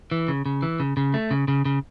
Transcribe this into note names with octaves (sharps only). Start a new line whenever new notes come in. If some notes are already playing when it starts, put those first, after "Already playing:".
E3
C#3
C#3
E3
C#3
C#3
A3
C#3
C#3
C#3